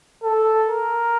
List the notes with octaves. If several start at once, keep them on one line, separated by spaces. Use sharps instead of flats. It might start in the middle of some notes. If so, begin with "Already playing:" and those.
A4
A#4